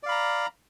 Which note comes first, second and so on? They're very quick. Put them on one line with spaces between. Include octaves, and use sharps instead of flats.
D5 F5 B5 A#5